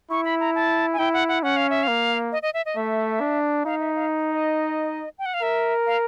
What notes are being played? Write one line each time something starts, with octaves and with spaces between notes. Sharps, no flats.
E4 C#6
B5
A#5
A5
G#5
E4 G5
F#5
F#5
C#4 F#5
F5
E5
F5
A#3
D#5
D#5
E5
D#5
A3 E5
D4
D#4 F5
E5
F5
D#5
G5
F#5
F5
A#4 E5
F5